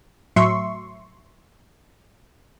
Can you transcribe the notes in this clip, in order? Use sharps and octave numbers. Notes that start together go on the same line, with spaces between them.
A2 F#3 E5 C6 C#6